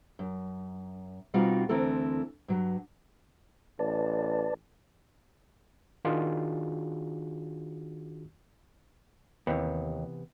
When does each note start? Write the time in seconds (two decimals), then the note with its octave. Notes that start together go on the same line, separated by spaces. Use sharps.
0.19 F#2
1.34 B2 G3 C4 D#4 F4 F#4
1.69 D2 E3 C4 E4 A4 A#4
2.48 G2 F#3
3.79 A1 B4 D5 A5
6.05 D#3 D4 F4 F#4 G#4
9.47 D#2 C3 E3 B3